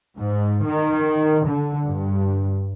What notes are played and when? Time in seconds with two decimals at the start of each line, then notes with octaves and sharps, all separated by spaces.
0.16 G#2
0.64 D#3
1.46 D3
1.85 G2